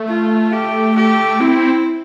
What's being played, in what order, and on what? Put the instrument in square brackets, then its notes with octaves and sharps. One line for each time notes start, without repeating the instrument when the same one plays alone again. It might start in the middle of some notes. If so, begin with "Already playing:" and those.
Already playing: [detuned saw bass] A3
[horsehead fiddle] F4
G4
G4
[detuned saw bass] C4 [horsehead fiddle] E4